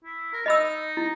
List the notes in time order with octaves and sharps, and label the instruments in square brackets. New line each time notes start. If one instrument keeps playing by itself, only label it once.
[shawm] E4
A#4
[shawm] D#4 [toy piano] D#5 B5 E6
[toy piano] E4